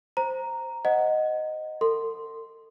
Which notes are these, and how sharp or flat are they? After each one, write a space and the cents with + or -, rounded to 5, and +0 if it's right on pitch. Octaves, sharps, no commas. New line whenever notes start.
C5 +0 A#5 +0
C5 +0 D#5 +0 F#5 +0
A4 +45 C6 +0